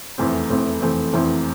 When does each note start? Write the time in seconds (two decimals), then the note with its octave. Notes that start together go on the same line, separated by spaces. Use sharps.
0.18 F1 E2 E3 A3 C4
0.50 F1 E2 E3 A3 C4
0.82 F1 E2 E3 A3 C4
1.13 F1 E2 E3 A3 C4